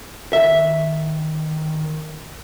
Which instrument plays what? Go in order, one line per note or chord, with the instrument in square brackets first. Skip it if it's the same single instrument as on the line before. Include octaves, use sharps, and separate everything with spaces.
[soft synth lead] D#3 [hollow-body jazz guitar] E5